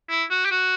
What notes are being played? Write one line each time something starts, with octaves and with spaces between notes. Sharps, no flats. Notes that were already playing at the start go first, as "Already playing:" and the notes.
E4
F#4
G4
F#4